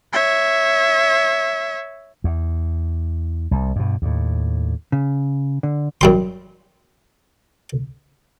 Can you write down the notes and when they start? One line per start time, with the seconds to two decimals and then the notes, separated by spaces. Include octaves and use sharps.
0.13 C#5 E5
2.24 E2
3.51 C2
3.76 G2 B2
4.02 D#2 A2
4.92 C#3
5.63 D3
6.01 F#2 G3 C6